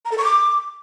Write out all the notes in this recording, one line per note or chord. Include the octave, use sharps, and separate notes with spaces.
A#5
A4
C#6
D6